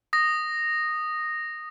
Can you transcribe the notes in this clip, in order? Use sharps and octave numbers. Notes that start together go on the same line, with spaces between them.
D#6 A#6